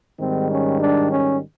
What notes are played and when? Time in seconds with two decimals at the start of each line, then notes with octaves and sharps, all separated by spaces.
0.20 G#2 D#3 G3 C4
0.51 C#4
0.81 D4
1.11 C#4